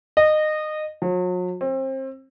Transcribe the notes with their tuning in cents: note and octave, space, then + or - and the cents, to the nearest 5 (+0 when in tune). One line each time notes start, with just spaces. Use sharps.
D#5 -20
F#3 -40
C4 +30